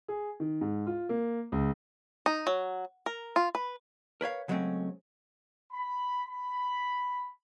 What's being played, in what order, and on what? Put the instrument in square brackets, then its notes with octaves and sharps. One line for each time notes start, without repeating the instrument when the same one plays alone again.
[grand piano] G#4
D#3
G#2
F4
A#3
C#2
[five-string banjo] D#4
F#3
A#4
F4
B4
[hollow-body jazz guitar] A#4 B4 C#5 F5
C#3 F#3 G#3 A3 C4 C#4
[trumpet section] B5
B5